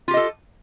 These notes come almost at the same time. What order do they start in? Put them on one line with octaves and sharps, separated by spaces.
F4 G4 D#5 A4